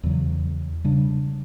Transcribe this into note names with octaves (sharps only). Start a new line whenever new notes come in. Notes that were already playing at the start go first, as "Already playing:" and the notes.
E2 C#3 F#3
C#3 G3 D4